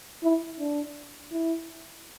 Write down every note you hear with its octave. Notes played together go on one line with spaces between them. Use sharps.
E4
D4
E4